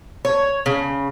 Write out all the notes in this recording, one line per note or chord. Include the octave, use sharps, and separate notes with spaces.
C#5
C#3